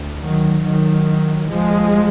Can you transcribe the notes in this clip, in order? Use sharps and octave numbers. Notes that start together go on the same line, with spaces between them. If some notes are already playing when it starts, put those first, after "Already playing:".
Already playing: D2
D#3 F#3
D#3 F#3
D#2 F3 G#3